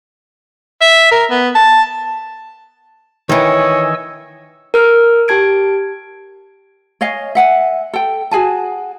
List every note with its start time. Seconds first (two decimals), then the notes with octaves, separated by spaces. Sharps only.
0.81 E5
1.12 A#4
1.31 B3
1.55 A5
3.29 D#3 E3 C#5 D#5 G#5 E6
4.74 A#4 F6
5.28 G4 A5 G#6 D7
7.01 C#5 D#5 F5 G#5
7.35 E5 F#5 G#5
7.93 A4 G5
8.31 F#4 G#4 G#5 A5